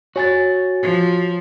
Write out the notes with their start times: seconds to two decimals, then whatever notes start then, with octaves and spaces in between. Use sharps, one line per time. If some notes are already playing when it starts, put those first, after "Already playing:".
0.16 F#4 C#5 G#5 A6
0.82 F3